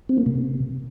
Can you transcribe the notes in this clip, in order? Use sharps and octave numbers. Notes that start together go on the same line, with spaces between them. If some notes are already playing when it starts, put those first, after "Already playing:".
C4
A#3
C3